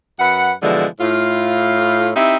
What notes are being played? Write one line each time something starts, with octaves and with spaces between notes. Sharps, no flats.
F#2 B4 F#5
B2 D3 E3 F3 G#3
A2 F4
C4 D#4 E4 G4 E5